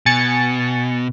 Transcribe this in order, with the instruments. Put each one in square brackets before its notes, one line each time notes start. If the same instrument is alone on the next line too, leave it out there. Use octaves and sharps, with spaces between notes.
[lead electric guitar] B2 [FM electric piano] G#5 A6 C#7